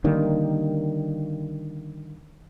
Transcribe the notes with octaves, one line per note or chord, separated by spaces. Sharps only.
D3 D#3 G3 A#3